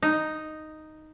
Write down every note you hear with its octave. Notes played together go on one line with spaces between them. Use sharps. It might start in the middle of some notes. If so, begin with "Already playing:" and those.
D#4